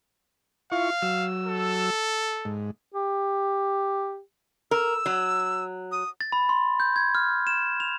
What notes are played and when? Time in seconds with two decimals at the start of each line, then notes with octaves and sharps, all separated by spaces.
0.72 E4 F4 F5 C#6
1.02 F#3 E6
1.47 A4
2.45 G#2
2.94 G4
4.71 A#4 E6
5.06 F#3
5.92 D#6
6.21 A6
6.32 B5
6.49 C6
6.80 G6
6.96 G#6
7.15 F6
7.47 E7
7.80 F7